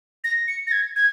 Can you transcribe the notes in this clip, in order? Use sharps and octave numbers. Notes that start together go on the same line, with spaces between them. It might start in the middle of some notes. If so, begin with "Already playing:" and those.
A#6
C#7
A#6
G#6
G#6